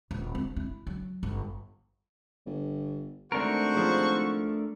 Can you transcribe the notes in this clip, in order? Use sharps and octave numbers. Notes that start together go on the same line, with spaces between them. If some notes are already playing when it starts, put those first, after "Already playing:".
D#1
C4
E4
F#3
G1
G1
G#1 A3 D4 F#4 A#4 C5 C#6
C#3 F3